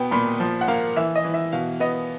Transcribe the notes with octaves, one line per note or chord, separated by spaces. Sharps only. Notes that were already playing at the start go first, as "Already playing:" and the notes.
Already playing: B2 B3 G5
A#2 B5
F3
F#5
A#3 F5
E3 E5
D#5
E3
E5
B2 F5
B3 D#5